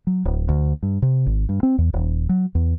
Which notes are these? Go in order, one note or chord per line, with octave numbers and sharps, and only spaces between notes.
F#3
D1
D2
G2
C3
G#1
G2
C4
E2
D#1
F#3
E2